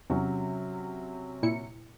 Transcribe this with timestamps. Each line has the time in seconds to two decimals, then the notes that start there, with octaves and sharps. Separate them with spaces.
0.10 E2 C3 F#3 C#4
1.43 A#2 E4 C#7